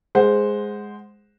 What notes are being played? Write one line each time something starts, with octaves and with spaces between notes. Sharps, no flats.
G#3 C5 F#5